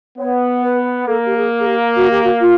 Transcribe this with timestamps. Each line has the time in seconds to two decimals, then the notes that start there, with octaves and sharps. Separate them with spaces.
0.19 B3 C#5
0.63 B4
1.07 A#3 A4
1.26 G4
1.37 G#4
1.60 G#4
1.66 G4
1.96 F#4
2.10 G4
2.24 F#4
2.41 F4